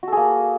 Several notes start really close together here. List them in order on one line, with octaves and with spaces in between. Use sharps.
F#4 A4 G#4 A#3